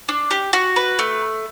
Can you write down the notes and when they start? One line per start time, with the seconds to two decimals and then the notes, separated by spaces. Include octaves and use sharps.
0.09 D4
0.31 G4
0.53 F#4
0.76 B4
0.99 A3